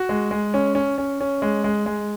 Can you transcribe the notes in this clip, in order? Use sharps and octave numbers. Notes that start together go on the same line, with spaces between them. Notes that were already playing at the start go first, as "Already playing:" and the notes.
Already playing: F#4
G#3
G#3
C#4
C#4
C#4
C#4
G#3
G#3
G#3